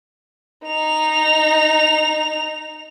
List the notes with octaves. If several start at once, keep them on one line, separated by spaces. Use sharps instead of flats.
D#4 F7